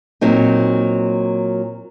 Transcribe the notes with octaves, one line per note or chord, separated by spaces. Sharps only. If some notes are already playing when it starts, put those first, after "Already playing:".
A#2 F#3 C4 D#4